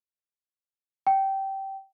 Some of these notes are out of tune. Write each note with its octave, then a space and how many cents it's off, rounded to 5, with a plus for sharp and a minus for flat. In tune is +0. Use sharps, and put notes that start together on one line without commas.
G5 -15